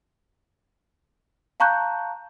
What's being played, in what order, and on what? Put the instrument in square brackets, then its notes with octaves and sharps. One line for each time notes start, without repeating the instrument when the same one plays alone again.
[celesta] F5 A5 A#5 C#6 F#6 G6